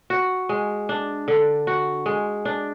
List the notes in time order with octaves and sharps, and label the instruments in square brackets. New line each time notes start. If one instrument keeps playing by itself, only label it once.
[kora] F#4
G#3
D4
D3
F#4
G#3
D4